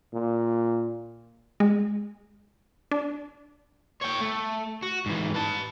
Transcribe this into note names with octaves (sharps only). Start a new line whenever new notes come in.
A#2
G#3
D4
C#5 G5
A3
F#4
G#2 E3
B4 A5